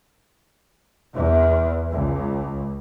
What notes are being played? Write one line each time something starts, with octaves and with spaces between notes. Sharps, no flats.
E2
C#2